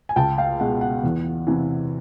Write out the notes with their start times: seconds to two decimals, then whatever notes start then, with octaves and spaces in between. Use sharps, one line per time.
0.09 G#5
0.16 C#2 G5 A5
0.38 F5 G5
0.60 B2 G#3 F#5
0.81 F#5
1.04 E2
1.47 C3 E3